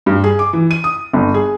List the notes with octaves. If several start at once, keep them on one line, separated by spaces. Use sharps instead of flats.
G2
G#4
D6
E3
D#7
D#6
G1
G#4